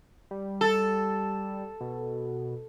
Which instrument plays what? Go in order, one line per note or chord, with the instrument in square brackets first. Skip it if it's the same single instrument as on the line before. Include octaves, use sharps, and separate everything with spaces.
[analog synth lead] G3
[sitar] A4
[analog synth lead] B2